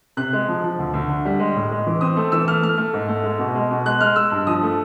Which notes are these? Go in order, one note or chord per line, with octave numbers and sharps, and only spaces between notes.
C3 F#6
G#3
F3
F3
D2
D2
D3
G3
G#3
A2
G#3
E3
C4 D#6
A3
E3 E6
A3 F6
A3 F6
A3
G#2
A3
G#3
B2
G#3
B2
G#3 F#6
G#3 F6
G#3 E6
G2
F3 D#6
A3